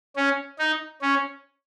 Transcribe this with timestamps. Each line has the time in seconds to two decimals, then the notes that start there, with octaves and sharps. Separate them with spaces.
0.16 C#4
0.59 D#4
1.02 C#4